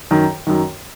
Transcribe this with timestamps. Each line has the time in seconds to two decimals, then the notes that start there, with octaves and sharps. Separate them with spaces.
0.11 F#2 D#3
0.47 F#2 D#3